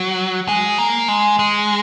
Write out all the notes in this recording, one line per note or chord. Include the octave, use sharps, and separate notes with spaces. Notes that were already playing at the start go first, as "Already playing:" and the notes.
Already playing: F#3
G#3
A#3
G#3
G#3